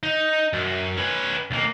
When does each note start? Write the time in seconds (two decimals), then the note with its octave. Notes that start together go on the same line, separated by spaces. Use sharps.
0.03 D#4
0.53 F#2
0.97 C#4 B4
1.51 B1 A#3